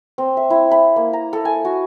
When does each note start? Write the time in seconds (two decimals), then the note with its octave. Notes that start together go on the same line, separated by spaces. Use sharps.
0.18 C4
0.37 E5
0.50 E4
0.71 B5
0.96 A#3
1.13 A#5
1.33 A4
1.45 G#5
1.65 F#4